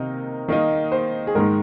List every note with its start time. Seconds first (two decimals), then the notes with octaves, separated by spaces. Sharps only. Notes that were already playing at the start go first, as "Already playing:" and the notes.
Already playing: C3 D#3 A#3 D#4 A#4
0.48 D#3 A#3 D#4
0.92 C5
1.27 G#4
1.35 G#2 D#3 G#3 A#4